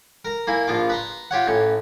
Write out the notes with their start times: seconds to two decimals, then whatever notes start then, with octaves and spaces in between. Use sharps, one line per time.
0.25 A#4 A#5
0.47 A#3 E4 G#5
0.67 A#1 F3 F4 D6
0.89 B4 A#5 C6
1.31 F4 G4 C#5 F#5
1.47 A1 C#4